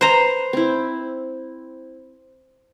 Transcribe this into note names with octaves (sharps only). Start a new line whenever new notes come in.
B4 C5 A#5
C4 E4